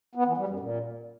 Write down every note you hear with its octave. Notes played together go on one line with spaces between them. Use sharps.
B3
E3
G3
F#2
A#2